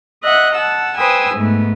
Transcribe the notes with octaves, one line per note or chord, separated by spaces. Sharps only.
D#5 E5 F#5 F#6
F#5 A5 E6
B4 C5 G5 G#5 D#6 E6
G#2 A3 B3